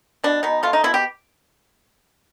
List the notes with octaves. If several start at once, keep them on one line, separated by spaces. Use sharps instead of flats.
B2 D4
B2 D#4
A3 F4
D#4
B2 E4
G4